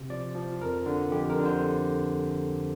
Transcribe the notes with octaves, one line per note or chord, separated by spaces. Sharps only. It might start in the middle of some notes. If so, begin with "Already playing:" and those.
Already playing: C3
F3 D5
F3
F2 A#4
D3
F2 G4
A#4
D3
C5